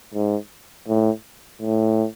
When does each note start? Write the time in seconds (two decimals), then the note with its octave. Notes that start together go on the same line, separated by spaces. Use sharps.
0.14 G#2
0.88 A2
1.61 A2